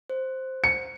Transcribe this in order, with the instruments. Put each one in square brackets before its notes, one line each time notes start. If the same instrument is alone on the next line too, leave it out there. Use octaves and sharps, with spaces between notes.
[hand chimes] C5
[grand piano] C#7